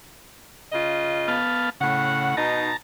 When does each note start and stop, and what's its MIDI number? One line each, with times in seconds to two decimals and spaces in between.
0.72 1.39 49
0.72 1.39 65
0.72 1.39 75
1.28 1.70 59
1.28 1.70 77
1.28 1.70 81
1.81 2.34 45
1.81 2.35 49
1.81 2.34 78
2.37 2.68 47
2.37 2.68 63
2.37 2.77 81
2.37 2.77 82